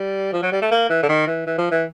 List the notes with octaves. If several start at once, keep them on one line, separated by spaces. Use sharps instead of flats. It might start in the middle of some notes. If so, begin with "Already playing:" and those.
Already playing: G3
F3
F#3
G3
A3
A#3
E3
D3
D#3
E3
E3
F3
E3